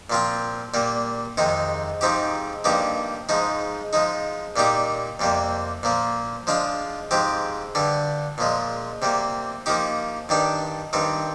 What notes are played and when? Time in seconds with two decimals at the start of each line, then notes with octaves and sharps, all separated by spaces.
0.10 A#2 F3 C4 F4
0.74 A#2 G3 A#3
1.37 F2 C3 D#3 G#3 D#4
2.01 G#2 F3 C4 D#4 G4
2.64 G2 F3 A#3 D#4 G4
3.29 G#2 F3 G#3 D#4
3.93 F3 G#3 D#4
4.56 A#2 G3 A#3 D#4 G4
5.19 F2 C3 G3 A#3
5.83 A#2 F3 A#3
6.47 F3 G#3 D4 F4
7.11 G#2 F3 G#3 C4 G4
7.75 G2 D3 G3
8.38 A#2 F3 G#3
9.02 C3 G3 A#3
9.66 F3 A#3 D#4 G4
10.29 G2 D#3 G3 D4
10.93 G2 D#3 G3 C4